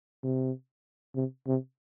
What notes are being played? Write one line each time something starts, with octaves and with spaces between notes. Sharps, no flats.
C3
C3
C3